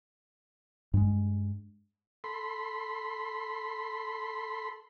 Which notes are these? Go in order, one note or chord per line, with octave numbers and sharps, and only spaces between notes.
G2 G#3
A4 B5 C6